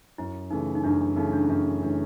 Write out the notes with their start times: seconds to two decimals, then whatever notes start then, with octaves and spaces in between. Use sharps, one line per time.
0.18 F#2 E4
0.50 C#3 E3 A3 D#4
0.75 D#4
0.84 F#2 D4
1.00 D4
1.16 C#3 E3 A3 D#4
1.33 D4
1.44 C#4
1.49 F#2 D4
1.66 C#4
1.83 C#3 E3 A3 D4